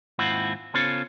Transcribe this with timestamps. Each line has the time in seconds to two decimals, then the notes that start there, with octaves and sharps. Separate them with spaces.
0.19 D#2 G#2 C4 E4 F4 F#5
0.74 C#3 B3 C#4 F4 A4 C5